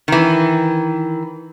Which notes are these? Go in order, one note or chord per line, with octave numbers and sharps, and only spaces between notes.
D#3 E3